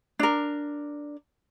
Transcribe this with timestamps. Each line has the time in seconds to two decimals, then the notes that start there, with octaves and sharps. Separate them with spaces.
0.19 D4 A#4